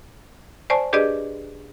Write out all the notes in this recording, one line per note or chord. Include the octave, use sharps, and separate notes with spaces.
C5 D5 G#5 A5 C#6
D4 G4 G#4 B4 D5 D#5